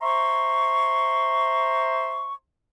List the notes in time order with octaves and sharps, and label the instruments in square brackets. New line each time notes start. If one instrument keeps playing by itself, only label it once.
[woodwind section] C5 E5 A#5 C6 C#6